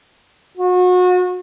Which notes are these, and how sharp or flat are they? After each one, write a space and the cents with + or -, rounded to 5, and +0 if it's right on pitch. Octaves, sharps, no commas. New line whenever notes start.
F#4 -35